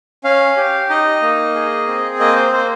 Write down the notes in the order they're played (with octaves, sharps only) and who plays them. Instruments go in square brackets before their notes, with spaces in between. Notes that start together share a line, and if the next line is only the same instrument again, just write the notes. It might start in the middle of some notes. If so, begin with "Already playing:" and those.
[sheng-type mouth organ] C#4 F5
G4
D#4 D#5
A#3
G#4
C4
A#3 D#5
C5
A#3 C5